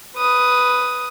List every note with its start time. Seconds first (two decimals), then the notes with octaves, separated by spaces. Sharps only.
0.17 B4 D#6